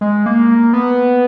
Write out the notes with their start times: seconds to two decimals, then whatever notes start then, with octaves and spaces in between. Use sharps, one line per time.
0.01 G#3
0.26 A#3
0.50 A#3
0.73 B3